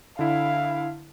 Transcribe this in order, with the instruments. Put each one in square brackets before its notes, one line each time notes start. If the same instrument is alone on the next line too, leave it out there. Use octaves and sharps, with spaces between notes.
[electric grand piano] D3 E4 [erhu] F5